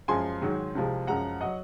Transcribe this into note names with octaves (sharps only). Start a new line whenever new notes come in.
F#2 F3 G#3 G#5 C6
G#2 D#3 F#3
C2 C3 F3 G#3
F#2 F3 G#3 F#5 A#5
F#3 D#5 F#5